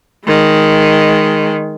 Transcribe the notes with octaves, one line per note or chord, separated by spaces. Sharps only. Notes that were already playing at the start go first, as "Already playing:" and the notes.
D#3 G#3